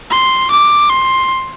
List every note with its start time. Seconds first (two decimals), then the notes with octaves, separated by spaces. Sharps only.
0.10 C6
0.51 D6
0.89 C6